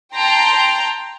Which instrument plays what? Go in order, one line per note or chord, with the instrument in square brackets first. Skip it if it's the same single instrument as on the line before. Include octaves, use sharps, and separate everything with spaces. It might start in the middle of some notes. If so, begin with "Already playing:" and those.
[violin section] G5 A5 A#5 C6